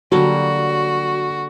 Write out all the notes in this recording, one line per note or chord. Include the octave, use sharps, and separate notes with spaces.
D3 F#3 G3 A#3 F#4